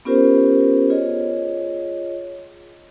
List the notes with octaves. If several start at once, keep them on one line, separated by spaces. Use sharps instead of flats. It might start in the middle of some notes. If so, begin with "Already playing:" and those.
B3 C#4 F4 G4 A#4 C5
F4 G#4 C#5 D#5